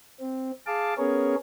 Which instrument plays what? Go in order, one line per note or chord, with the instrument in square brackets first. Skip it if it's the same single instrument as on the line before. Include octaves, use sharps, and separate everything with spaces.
[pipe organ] C4
G#4 F5 A5 D6
B3 C#4 G#4 A#4 C#5